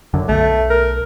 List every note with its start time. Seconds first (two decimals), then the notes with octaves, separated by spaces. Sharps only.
0.14 F#2 D3
0.29 B1 A3
0.70 A#4